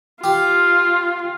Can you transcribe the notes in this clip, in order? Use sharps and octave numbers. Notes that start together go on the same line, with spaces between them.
F4 G4